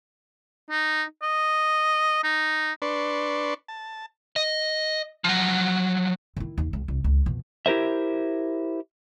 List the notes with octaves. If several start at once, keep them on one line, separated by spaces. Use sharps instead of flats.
D#4
D#5
D#4
D4 B4 D5 C6 C#6
A5
D#5
F3 F#3
D#3 E4
D#2
C#2
C2
C#2
F2 B2
E4 G4 A#4 C5 E5